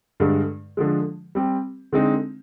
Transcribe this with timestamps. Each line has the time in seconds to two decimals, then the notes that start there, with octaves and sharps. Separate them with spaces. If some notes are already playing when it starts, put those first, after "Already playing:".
0.20 G2 D3 G#3
0.77 D3 F3 G#3
1.35 G3 C4 G4
1.93 D3 G#3 C4 D#4